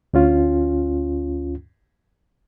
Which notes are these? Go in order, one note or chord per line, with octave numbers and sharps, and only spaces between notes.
D2 C#4 F4